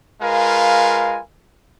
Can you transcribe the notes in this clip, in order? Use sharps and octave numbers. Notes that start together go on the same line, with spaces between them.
G#3 F4 A#4 B4 F5 G#5